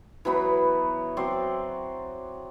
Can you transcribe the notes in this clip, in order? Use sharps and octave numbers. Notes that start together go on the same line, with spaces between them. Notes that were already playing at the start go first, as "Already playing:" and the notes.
E3 F#3 B3 B5
F#3 C4 D5 C6